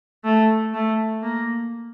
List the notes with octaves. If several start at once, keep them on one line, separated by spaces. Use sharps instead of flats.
A3
A3
A#3